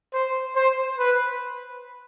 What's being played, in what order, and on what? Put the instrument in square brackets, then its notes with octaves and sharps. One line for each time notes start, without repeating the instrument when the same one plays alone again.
[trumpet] C5
C5
B4